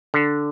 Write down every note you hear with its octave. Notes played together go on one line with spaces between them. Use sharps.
D3